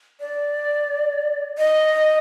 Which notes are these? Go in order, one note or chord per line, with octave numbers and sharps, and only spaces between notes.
D5
D#5